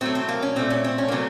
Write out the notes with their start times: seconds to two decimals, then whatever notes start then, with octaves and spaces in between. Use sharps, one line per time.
0.01 A2 F#3 A3 C4
0.15 C4
0.28 A#3
0.42 C#4
0.56 A#2 A3 C4
0.70 C#4
0.84 C4
0.98 C#4
1.08 A#3
1.11 C#3 F#3 A3 C4